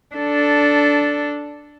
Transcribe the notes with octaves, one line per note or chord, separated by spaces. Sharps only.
D4 A4